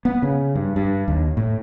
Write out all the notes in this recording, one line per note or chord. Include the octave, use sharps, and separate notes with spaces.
B3
C#3
G2
G2
D#2
A2